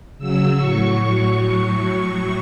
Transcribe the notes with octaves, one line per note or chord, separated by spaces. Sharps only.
C#3 F#3 E6
A2 F#3 C#6